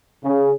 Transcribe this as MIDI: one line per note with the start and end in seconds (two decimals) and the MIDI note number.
0.23 0.52 49